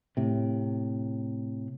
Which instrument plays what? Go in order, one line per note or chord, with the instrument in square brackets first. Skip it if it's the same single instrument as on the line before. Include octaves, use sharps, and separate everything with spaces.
[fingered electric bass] A2 C3